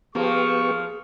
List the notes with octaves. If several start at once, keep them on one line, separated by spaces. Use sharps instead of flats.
F3 A#3 B3 G4 G#4 C#6